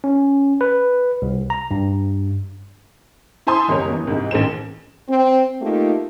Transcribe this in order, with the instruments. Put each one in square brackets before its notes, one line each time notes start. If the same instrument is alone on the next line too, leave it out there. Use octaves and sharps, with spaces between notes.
[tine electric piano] C#4
B4
C2
A#5
G2
[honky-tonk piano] E4 C5 G#5 A5 C6 D#6
F#1 C2 C3 A#4 C#5
G1 E3
C2 G#2
A1 D#3 G#4 C5 E7
[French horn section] C4
A3 A#3 D#4 F4 G4